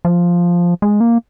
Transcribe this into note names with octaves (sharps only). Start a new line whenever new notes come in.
F3
G#3
A#3